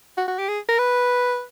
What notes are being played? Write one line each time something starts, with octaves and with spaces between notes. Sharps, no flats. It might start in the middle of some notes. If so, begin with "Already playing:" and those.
F#4
F#4
G4
G#4
A#4
B4